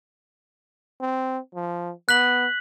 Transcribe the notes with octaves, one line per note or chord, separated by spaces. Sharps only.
C4
F3
B3 F#6 B6 F#7